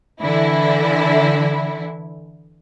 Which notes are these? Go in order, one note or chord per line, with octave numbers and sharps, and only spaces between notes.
D3 E3 E4